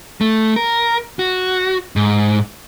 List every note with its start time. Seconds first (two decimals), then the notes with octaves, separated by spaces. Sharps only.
0.21 A3
0.56 A#4
1.19 F#4
1.96 G#2